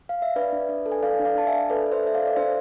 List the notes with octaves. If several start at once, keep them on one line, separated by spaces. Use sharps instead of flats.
F5
E5
D4 B4 D5
D4
D4
A4
G#5
A4 D5 F5
D4
D5 F5
D4 A5
E5 G#5
D4
A4 B4 D5
A4
C5 E5
A4 E5
D5 F5
A4
D5
D4 C5 E5